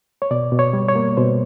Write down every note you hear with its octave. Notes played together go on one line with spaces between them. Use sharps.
C#5
B2 D5
B2
C#5
G3
C#5
A#3
B2 C5